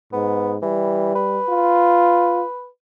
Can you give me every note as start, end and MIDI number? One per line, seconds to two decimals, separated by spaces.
0.13 0.57 44
0.13 0.53 59
0.63 1.15 52
0.63 1.39 55
1.15 2.68 71
1.49 2.44 65